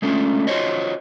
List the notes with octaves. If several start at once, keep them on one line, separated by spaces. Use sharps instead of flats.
G#3 A3 C#4 D4 F4
F4 F#4 A#4 C5 C#5 D#5